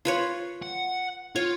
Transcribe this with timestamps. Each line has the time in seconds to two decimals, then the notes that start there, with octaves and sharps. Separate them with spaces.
0.05 F4 B4 C#5
0.63 F#5
1.36 F4 C#5